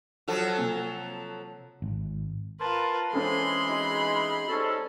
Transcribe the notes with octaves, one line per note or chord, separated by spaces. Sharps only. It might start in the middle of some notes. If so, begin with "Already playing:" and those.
F3 F#3 A4
C3 A#3 C4
G#1
F4 A#4 B4 A5 C6
E3 G#3 C4 C#4 A4 B5 C6
D#4 F#4 G#4
G3 C4 C#4 D#4 A4